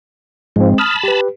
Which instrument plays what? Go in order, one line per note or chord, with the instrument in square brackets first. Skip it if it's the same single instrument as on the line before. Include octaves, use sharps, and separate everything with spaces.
[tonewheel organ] G#2 F3 [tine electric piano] G#3 C4
[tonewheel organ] A5 B5 [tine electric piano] D#6 F6
[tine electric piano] G4 B4